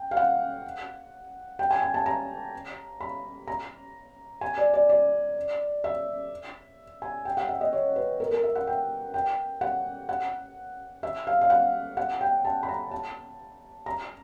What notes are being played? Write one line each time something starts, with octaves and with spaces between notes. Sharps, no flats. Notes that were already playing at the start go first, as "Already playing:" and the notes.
Already playing: G5
F5
F#5
G5
G#5
G#5
A5
A#5
B5
A#5
G#5
D5
D5
D5
E5
G#5
G5
F#5
E5
D#5
C#5
B4
A#4
A#4
E5
F#5
G5
G5
F#5
F#5
E5
F5
F5
F#5
F#5
G5
A5
B5
A#5
A5
A#5